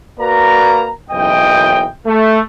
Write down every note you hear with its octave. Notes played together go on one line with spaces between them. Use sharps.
A#3 F#4 B4 D5 A#5
F#1 B1 F#2 E3 D#5 G5
A3